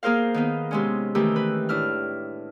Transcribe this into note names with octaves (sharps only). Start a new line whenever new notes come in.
A#3 G#4 A#4 C5 F5
D#3 B3 D#4
C3 G#3 C#4
D#3 E3 A3 G4
B4
A2 D4 E4 F6